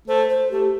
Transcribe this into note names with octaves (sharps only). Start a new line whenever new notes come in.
A3 C5
C5
A3 G4